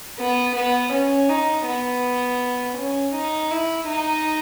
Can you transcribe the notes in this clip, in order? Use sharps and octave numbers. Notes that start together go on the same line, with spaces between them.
B3
B3
C#4
D#4
B3
C#4
D#4
E4
D#4